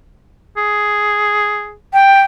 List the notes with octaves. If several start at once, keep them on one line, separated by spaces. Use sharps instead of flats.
G#4
G5